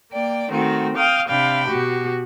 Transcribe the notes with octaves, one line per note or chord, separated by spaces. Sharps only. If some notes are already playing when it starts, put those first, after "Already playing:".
A#3 D5 G5
D#3 A3 C4 F#4
F5 G5 D#6 F6
C3 D4 F5 G5 B5
B2 F#4 G4